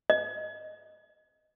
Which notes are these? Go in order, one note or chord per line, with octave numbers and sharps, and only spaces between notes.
D#5